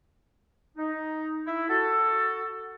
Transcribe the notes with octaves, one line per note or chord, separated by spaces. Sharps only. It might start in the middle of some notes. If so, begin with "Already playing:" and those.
D#4
E4
F#4 A4